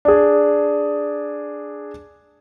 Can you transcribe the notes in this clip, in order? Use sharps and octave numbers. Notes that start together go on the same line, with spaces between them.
D4 G#4